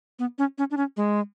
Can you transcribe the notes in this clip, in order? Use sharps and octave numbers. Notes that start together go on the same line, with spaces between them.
B3
C#4
C#4
D4
C#4
G#3